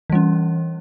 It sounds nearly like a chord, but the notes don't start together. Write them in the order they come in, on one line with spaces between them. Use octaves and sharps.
E3 G3 C#4